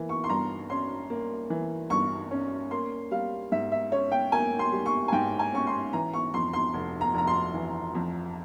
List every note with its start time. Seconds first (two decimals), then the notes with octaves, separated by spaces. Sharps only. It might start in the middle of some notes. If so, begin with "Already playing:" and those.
Already playing: E3 A#3
0.09 C#6
0.24 C6
0.29 G2 A#5
0.70 C#4 C6
1.10 A#3
1.50 E3
1.90 G2 C#6
2.31 C#4
2.71 A#3 C6
3.11 G3 F5
3.52 G#2 E5
3.72 E5
3.92 C#4 C#5
4.12 G5
4.32 A#3 G#5
4.59 C6
4.72 G3
4.86 C#6
5.08 G#5
5.12 G#2 G5
5.39 G#5
5.53 C#4 C#6
5.67 C6
5.93 E3 A#5
6.13 C#6
6.34 F2 C6
6.53 C6
6.74 F1
7.01 A#5
7.14 F1 A#5
7.27 C6
7.54 E3
7.95 F2